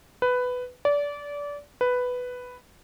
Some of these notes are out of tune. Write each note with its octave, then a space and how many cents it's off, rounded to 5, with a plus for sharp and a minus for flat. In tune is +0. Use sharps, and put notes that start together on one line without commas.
B4 +10
D5 -25
B4 +5